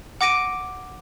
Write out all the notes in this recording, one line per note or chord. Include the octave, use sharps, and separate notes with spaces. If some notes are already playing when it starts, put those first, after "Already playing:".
F#5 D6 A#6 D7 D#7